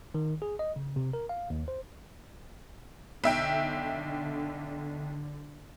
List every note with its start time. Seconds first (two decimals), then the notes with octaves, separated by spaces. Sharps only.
0.15 D#3
0.42 G#4
0.59 D#5
0.76 C#3
0.96 C3
1.13 A#4
1.29 F5
1.50 D#2
1.68 C5
3.24 B1 D3 E5 G5